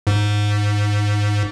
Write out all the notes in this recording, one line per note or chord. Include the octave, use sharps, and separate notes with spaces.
G#2